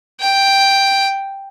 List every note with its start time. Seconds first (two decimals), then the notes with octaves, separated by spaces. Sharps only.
0.21 G5